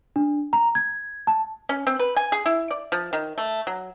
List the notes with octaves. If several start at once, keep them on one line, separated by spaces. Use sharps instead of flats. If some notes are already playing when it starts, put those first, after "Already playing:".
D4
A#5
G#6
A5
C#4
C4
B4
G#5
G#4
E4
D5
F3
D#3
A3
F#3